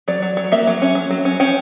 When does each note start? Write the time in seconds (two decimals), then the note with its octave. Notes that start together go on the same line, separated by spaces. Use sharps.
0.08 F#3 D5
0.22 F#3
0.37 F#3
0.52 A#3 E5
0.67 F#3
0.82 C#4
0.95 F#3
1.10 F#3
1.25 C#4
1.40 C#4 G5